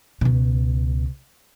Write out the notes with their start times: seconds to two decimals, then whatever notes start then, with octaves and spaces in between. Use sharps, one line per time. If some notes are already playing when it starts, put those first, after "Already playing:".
0.21 C#2 B2